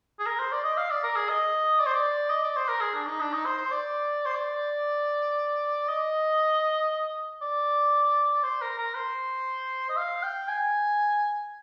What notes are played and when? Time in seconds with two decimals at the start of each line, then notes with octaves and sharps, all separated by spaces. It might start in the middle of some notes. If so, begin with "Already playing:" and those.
0.19 G#4
0.26 A#4
0.39 C5
0.52 D5
0.64 D#5
0.77 F5
0.90 D5
1.03 A#4
1.16 G#4
1.29 D#5
1.80 D5
1.86 C5
1.94 D5
2.30 D#5
2.44 D5
2.56 C5
2.68 A#4
2.81 G#4
2.94 D4
3.07 D#4
3.21 D4
3.33 D#4
3.45 C5
3.58 C5
3.71 D5
4.26 C5
4.35 D5
5.89 D#5
7.42 D5
8.43 C5
8.61 A#4
8.78 A#4
8.95 C5
9.89 D#5
9.97 F5
10.23 G5
10.48 G#5